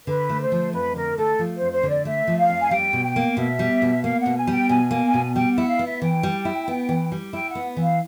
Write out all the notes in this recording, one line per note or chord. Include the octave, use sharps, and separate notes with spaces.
D3 B4
A3
C5
F3
F2 B4
D3 A#4
A3 A4
F3
F2 C5
C5
D3
D5
A3 E5
F3
F5
F2
G#5
G3 G5
B2
G5
A#3
B2 E5
G3
B2
A#3 F5
F#5
B2
G#5
G3
G5
B2 G#5
A#3
B2
G3 G5
F#5
E4
F5
B3
E5
E3 G5
G3
E4
B3
E3
G3
E4 G5
F#5
B3
E3
F5